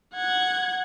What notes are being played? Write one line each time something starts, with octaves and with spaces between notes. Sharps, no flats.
F#5 G#6